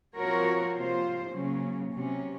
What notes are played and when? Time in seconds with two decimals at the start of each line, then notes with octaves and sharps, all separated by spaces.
0.17 F3 C4 F#4 A#4 C#5
0.76 C3 F3 A#3 F4 C5
1.34 C#3 F#3 A#3 C#4
1.92 C3 F#3 C#4